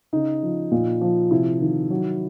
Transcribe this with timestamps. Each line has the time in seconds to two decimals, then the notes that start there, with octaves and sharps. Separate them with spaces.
0.13 C#3 D#4
0.43 F3
0.72 A#2
1.01 F3
1.31 C3 E4
1.61 D#3
1.90 F#3